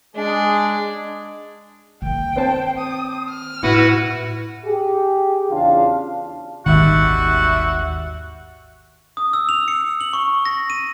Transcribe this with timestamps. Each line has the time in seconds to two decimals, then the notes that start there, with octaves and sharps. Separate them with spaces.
0.16 G#3 D4 G#4
2.02 D#3 A#3 G5
2.36 C4 C5 A5
2.78 D#6
3.29 F6
3.63 A2 E4 F#4 B4 F#5
4.65 G4 G#4
5.50 E2 C#3 D4 F4 F5 A5
6.66 D#1 G#1 D#3 G3 F#4 E5 F#5
9.17 D#6
9.33 E6
9.49 F7
9.68 C#7
10.01 F#7
10.13 C#6
10.45 A#6
10.70 D#7